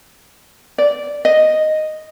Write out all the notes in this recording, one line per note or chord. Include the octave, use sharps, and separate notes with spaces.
D5
D#5